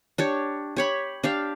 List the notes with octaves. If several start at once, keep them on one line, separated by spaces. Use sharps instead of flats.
D4 G4 C#5
G4 C#5 B5
D4 G4 F5